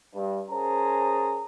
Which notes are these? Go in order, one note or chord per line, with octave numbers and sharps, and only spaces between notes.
G2
C#4 G#4 A#4 C5 A5 A#5